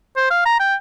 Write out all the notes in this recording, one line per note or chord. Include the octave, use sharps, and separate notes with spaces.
C5
F5
A#5
G5